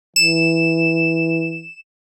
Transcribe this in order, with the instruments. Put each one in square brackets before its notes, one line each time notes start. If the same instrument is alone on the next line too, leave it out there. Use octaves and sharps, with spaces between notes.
[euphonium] E3 [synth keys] E7